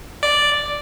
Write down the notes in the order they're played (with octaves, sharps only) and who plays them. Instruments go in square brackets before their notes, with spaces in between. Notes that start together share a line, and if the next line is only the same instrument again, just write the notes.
[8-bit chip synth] D5